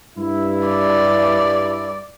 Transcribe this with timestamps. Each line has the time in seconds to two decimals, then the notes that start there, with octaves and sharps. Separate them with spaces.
0.17 G2 E4
0.68 D5